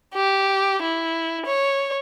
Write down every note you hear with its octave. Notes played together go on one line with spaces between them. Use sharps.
G4
E4
C#5